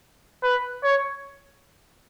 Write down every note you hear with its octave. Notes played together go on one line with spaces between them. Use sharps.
B4
C#5